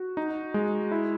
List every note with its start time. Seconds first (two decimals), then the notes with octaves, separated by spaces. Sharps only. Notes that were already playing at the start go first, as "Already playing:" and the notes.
Already playing: F#4
0.17 D#4
0.54 G#3
0.92 E4